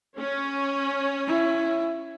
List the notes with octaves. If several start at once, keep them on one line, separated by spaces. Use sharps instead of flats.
C#4
E4